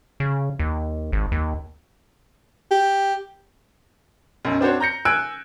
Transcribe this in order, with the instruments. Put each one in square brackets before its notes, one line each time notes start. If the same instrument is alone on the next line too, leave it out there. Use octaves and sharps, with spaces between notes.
[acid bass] C#3
D#2
G#1
D#2
[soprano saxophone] G4
[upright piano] B1 F#2
C4 D4 F#4 C5 C#5
A#5 G6 A#6 C#7
G#5 E6 F#6 G#6 D7